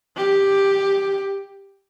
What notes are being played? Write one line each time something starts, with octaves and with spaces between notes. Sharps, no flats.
G4